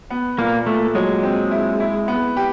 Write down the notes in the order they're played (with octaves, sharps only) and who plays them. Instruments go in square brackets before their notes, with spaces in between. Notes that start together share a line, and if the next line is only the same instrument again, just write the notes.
[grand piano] B3
[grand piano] A#2 [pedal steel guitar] A#3
[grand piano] A#2 [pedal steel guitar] A3
[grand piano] F#3 [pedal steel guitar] G#3
[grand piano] C4
E4
E4
B3
G4